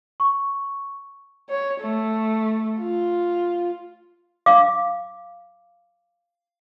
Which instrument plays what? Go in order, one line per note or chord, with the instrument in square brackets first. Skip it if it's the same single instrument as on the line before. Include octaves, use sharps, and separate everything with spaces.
[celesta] C#6
[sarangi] C#5
A3
F4
[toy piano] F5 D6